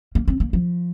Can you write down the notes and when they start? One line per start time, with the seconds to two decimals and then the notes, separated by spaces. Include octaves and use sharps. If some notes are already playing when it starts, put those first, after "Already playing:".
0.15 A#3
0.28 C4
0.40 A#3
0.53 F3